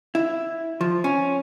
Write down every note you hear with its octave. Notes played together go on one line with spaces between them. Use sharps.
E4
F3
C#4